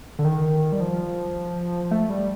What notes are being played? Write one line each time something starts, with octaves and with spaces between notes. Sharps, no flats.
D3
D#3
G3
F3
A3
G3